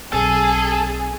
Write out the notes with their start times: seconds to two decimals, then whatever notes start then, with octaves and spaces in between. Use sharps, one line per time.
0.12 B1 C4 G#4 A4